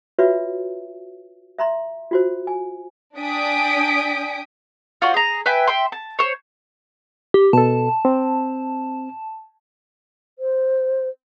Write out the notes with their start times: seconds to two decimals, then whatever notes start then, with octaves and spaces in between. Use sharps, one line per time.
0.19 F4 F#4 B4 C#5 E5
1.59 E5 A#5 C6
2.11 F4 F#4 C5
2.47 G#5
3.18 D4 G5 G#5 D#6 B6 D7
5.02 F4 F#4 C5 D5
5.14 G#4 A#5
5.46 B4 E5 G5 G#5
5.68 E5 G5 C6
5.92 A5
6.19 C5 C#5
7.34 G4
7.53 B2 A4 A5
8.05 C4
10.39 C5